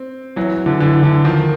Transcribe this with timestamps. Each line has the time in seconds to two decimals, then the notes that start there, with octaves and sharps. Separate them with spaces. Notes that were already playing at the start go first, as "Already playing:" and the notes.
Already playing: C4
0.36 E3 F#3
0.66 D3 E3
0.80 D3 E3
1.02 D3 E3
1.24 D#3 F3